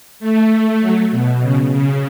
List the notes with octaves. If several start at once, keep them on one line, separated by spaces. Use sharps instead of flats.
A3
F#3
B2
C#3
C#3